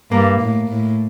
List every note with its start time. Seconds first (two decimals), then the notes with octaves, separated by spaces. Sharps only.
0.11 G2 A#3
0.40 A2
0.68 A2